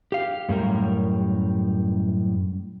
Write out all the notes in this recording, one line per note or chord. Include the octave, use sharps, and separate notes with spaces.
G4 F5
F#2 A2 G3 A#4